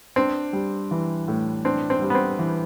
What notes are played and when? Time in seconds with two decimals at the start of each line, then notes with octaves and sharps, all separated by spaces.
0.16 C4 D4
0.53 G3
0.91 E3
1.28 A2
1.65 C4 D4
1.90 C4
2.02 G3
2.10 B3
2.15 C4
2.39 E3